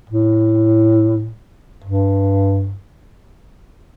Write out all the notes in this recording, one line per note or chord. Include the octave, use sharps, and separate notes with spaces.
A2
G2